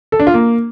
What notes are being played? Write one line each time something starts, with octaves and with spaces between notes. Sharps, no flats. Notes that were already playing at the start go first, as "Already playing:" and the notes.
A4
D4
F4
A#3